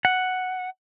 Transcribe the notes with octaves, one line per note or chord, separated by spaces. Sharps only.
F#5